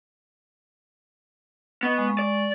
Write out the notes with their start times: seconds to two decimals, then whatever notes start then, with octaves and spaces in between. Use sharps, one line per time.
1.83 B3 D#5 C#6
1.98 G#3 C#6
2.19 D5